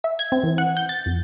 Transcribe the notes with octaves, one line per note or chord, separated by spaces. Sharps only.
E5
G#6
C4
E3
F#5
G6
A6
F2